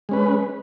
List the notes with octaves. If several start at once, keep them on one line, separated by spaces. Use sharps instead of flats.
G#3 C#4 B4